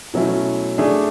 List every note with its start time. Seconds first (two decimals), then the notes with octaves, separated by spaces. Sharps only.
0.14 B2 F#3 A3 C#4 E4
0.78 A3 D4 G#4